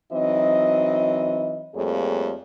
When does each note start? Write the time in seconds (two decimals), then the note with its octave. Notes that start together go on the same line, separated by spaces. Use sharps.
0.12 E3 F#3 C4 D#4 D#5
1.75 F2 G3 A3 A#3 G#4 C#5